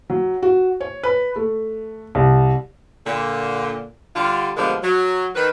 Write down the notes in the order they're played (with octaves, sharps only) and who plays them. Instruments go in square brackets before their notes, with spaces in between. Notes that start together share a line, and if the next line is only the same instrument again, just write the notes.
[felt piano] F#3
F#4
C#5
B4
A3
C2
[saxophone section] A#2 D3
D3 G3 F4
B2 D3 F3 G3 G#3 A#3
F#3
D#3 B4